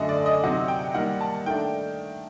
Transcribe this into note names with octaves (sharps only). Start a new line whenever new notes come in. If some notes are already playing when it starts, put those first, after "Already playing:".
Already playing: F#2 D3 A3 D#5
D5
D#5
C3 F#3 C4 D#4 F#5
G5
D#3 G3 A#3 F#5
A5
D#3 A3 D4 G5